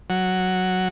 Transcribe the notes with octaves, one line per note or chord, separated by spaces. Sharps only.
F#3